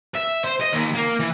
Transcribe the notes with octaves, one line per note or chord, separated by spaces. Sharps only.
E5
C5
D#5
D#2
A#3
E3